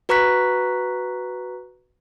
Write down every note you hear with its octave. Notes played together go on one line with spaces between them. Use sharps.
F#4 B4 A#5 C#6 F#6 B6